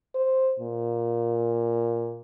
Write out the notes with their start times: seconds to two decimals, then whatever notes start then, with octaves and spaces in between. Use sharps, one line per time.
0.15 C5
0.59 A#2